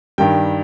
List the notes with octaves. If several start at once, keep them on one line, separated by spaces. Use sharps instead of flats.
G2 D#3 G3 G5